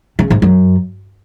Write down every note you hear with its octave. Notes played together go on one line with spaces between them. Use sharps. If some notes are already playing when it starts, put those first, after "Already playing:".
C#3
G#2
F#2